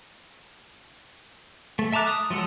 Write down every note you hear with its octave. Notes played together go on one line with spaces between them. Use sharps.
A3
E5 A5 A#5 D6 F#6
D#6
F3 F#3 G#3 A4